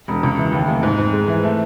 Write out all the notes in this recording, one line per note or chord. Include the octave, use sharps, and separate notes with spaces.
E1
C#2
E3
D#2
F1
G#2
G#2
G#3
E3
A3